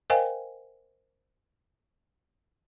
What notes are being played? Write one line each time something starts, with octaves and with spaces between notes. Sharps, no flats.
A#4 C5 D#5 F5 G5 G#5